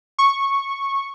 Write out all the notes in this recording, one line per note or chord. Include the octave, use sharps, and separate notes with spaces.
C#6